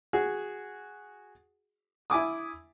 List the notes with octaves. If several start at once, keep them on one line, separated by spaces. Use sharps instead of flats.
F#4 G#4
E4 G#5 D6 D#6